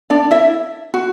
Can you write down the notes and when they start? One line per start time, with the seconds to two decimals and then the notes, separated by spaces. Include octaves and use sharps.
0.10 D4 D5
0.31 E4 E5
0.94 F#4